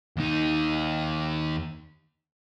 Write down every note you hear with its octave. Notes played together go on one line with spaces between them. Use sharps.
D#2 D#4